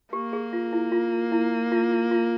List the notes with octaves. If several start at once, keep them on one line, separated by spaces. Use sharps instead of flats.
A#3 G4
G#4
F4
E4
F4
E4
F4
F4
F4